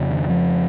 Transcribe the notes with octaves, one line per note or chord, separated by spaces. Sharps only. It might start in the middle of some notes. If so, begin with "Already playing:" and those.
Already playing: F2 C#3
D#3
F3